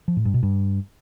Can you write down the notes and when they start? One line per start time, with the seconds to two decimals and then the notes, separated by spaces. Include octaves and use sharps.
0.08 F3
0.17 A2
0.25 G2
0.34 B2
0.43 G2